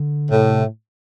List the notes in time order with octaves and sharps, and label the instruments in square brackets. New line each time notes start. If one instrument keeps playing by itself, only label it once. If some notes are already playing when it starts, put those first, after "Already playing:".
Already playing: [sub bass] D3
[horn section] A2 [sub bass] C3